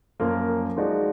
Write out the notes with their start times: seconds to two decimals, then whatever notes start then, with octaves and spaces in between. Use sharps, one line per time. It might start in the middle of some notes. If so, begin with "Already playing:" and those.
0.20 F#2 F3 A#3 F4 A#4
0.76 F3 G#3 D#4 F#4 D5